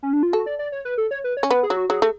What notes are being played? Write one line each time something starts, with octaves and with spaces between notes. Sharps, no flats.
C#4
D4
F4
F#4 A4
D5
D5
C#5
B4
A4
C#5
B4
C#5
C#4
B3 B4
G#4
F#3
F#4
F#3 G#4
A3